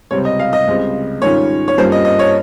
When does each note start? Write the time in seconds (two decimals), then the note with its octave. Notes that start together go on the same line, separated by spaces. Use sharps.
0.11 C#2 C3 G3 C4 C#5
0.25 D#5
0.39 F5
0.53 D#5
0.67 C#2 C#3 G3 C4
1.22 G#2 D#3 G3 C#4 F4 C#5
1.68 C#5
1.78 G2 G3 A#3 C#4 F4 C5
1.92 D#5
2.05 D#5
2.19 C#5